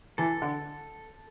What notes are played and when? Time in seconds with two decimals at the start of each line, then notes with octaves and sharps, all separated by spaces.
0.18 E3 A4
0.42 D3